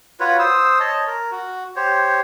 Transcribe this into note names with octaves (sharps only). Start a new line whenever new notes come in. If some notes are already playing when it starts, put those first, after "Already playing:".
F4 F#4 B4 C#5
C5 D#6 E6
C#5 D#5 A5
A#4
F#4
G4 C5 C#5